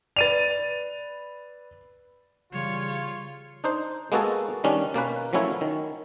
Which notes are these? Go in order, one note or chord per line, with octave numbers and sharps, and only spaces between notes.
B4 D5 A6 D#7 F7
C#3 E3 G3 F4 C#5
D4 D#4 C5
G#3 A#3 B3 F#4 G#4 A4
D#3 G3 C#4 D4
B2 A#3 C#4 B4
F3 F#3 A3 C#4 E4 C#5
D#3